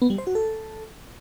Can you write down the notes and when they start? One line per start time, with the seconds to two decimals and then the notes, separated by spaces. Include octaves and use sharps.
0.02 B3
0.10 G3
0.18 C5
0.27 F#4
0.35 A4